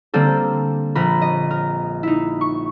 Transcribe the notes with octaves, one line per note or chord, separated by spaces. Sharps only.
D3 G3 A#3 C4 A4
A#1 A#4 B5
D#5
A#4
D#4 E4
C#6